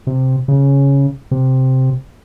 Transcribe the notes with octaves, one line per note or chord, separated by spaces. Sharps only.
C3
C#3
C3